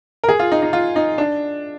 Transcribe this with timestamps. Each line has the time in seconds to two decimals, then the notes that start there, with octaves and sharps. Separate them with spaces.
0.24 A#4
0.28 G#4
0.39 F4
0.52 D#4
0.63 D#4
0.73 F4
0.96 D#4
1.18 D4